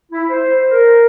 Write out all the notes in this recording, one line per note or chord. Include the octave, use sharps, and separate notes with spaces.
E4
C5
A#4